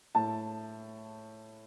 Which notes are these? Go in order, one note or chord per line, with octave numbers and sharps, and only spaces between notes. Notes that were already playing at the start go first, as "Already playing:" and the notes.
A2 A5